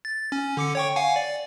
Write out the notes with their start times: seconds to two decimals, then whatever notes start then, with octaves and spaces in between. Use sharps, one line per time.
0.05 A6
0.32 C#4
0.57 D3 D6 C#7
0.75 C#5 G5 C#6
0.96 F5 F#5 G#5
1.16 D5